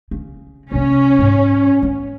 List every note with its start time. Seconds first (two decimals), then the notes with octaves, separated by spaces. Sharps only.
0.11 C#3
0.72 C3 A#3 C#4
1.19 G#2 B3
1.82 B3